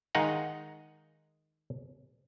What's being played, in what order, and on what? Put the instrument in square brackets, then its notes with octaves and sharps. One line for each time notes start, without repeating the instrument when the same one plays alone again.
[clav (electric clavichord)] D#3 G#3 D#4 D#5 F5 F#5